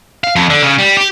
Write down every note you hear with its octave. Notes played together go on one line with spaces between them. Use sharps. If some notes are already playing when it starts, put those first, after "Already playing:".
F5
F2
D3
C#3
G3
G4